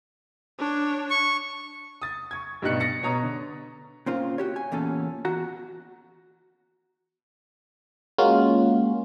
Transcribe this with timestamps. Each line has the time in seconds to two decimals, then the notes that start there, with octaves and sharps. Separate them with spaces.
0.59 D4 C#5
1.10 C#6
2.02 D#6 A6
2.31 C#6 G#6
2.62 G2 B2 G3 D#4 F#6 C#7
2.80 A6 A#6 C#7
3.03 B2 C#5 A#5 D#6
3.23 D3
4.06 A#2 C#3 C4 F4
4.38 F#4 G4 C#5
4.56 G#5
4.72 E2 A#2 C#3 C#4 A4
5.25 E2 F#4 F#5 A#5
8.18 G#3 A#3 C#4 F4 F#4